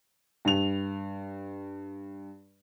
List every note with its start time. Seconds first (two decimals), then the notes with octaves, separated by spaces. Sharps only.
0.45 G2 F7